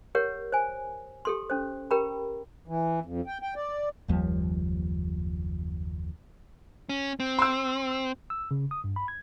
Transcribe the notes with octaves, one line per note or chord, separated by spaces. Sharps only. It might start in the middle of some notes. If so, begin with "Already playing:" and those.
G4 A#4 C#5 F#5
C5 G#5
G4 A4 C6
C#4 C5
G4 A#4 G5 A#5 B5
E3
F2
G5
G5
D5
F#1 D#2 F3 G3
C#4
C4
C6 E6
E6
C#3
D#6
G2
B5
G#6